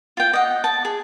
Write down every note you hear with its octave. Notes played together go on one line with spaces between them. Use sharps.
F4 G5
D#5 F#5
A5
G#4